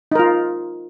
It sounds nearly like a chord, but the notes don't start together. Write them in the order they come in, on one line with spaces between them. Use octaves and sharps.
D#4 A#4 F4